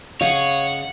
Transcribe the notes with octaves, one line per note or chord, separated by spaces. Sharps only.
C#3 C#5 D#5 F5 F#5